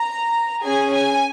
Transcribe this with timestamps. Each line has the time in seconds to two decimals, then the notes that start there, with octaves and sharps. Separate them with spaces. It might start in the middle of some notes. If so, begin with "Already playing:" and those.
Already playing: A#5
0.64 C#4 G#4 G#5
0.93 G#5